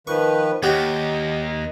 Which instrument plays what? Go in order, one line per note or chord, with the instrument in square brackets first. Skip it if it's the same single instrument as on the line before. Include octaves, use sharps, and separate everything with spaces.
[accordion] D#3 F3 B4 [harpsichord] C#6
[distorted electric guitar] D#2 [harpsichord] F#4 G4 C#5 [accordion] D#5